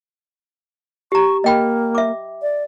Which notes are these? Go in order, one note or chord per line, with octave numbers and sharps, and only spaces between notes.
G4 A#5 C#6
A#3 D#5 G5 B5
E5 D6
D5